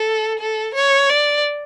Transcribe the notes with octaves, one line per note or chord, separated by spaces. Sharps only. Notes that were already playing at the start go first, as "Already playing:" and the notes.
Already playing: A4
A4
C#5
D5